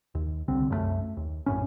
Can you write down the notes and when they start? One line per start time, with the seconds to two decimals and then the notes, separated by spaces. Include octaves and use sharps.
0.15 D#2
0.48 C2 D3 C4
0.69 C2 F#2 E3 A3
1.17 D#2
1.46 A#1 F#2 A2 C#4